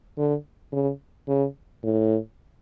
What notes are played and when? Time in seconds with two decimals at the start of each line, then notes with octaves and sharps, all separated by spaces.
0.18 D3
0.72 C#3
1.28 C#3
1.83 A2